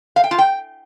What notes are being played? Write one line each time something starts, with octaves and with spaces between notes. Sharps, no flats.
F5
G5
F4
G5